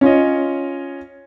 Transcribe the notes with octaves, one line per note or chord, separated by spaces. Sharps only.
C#4 F4 C#5 D#5